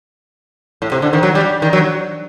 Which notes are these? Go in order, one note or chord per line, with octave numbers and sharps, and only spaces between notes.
A2
C3
D3
D#3
F#3
G3
D#3
F#3